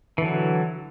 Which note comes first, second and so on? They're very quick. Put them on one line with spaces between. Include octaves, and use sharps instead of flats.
E3 D3 F#3